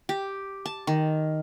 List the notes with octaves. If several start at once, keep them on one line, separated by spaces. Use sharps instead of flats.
G4
A5
D#3